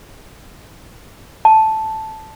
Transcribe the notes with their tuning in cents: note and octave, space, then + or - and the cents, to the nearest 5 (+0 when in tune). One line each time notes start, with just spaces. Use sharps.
A5 -5